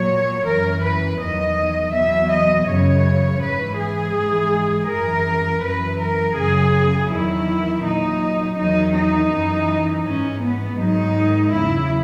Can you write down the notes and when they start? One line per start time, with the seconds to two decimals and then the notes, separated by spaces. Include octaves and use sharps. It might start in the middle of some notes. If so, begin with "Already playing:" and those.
Already playing: A#2 F#3 C#5
0.46 F#2 E3 A#4
0.83 B4
1.20 E2 D#3 F#3 D#5
1.93 E2 B2 F#3 E5
2.31 D#5
2.67 F#2 C#3 E3 C#5
3.41 G#2 E3 B4
3.78 G#4
4.15 G#2 E3
4.88 E3 A#4
4.94 F#2
5.62 F#2 E3 B4
5.99 A#4
6.36 F#2 C#3 F#3 G#4
7.10 E2 D#3 F#3 E4
7.84 A#2 F#3 D#4
8.58 E2 D#3 F#3 D#4
8.95 D#4
9.32 F#2 E3
10.05 G#2 E3 C#4
10.42 B3
10.79 G#2 D#3 F#3 D#4
11.53 E2 C#3 F#3 E4